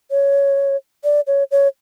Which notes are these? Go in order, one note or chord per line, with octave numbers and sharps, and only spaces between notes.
C#5
D5
C#5
C#5